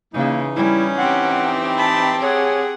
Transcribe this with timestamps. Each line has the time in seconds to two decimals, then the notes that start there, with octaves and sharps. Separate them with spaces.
0.14 C#3 E3 A#3 D#4
0.56 G3 C#4 E4
0.98 C4 G4 F#5
1.79 A5 B5
2.23 G#4 C#5 F#5